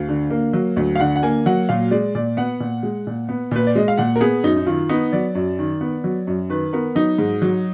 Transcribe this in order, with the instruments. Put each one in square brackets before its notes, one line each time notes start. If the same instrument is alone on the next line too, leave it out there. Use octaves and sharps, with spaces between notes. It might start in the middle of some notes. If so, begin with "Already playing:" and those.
Already playing: [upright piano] D2 F5
D3
A#3
F#3
D2
F5
D3 F#5
F#5
A#3 G#5
F#3 F#5
A#2 F5
G#3 D5
A#2 D5
B3 F#5
A#2
G#3
A#2
B3
A#2 B4
D5
G#3 D#5
F5
A#2 F#5
A#4
B3 G#4
F#2 D#4
D#4
D#3 F4
B3 D#4
F#3 D5
F#2
D#3
B3
F#3
F#2
D#3 B4
B3 A#4
F#3 D#4
G#2
F#3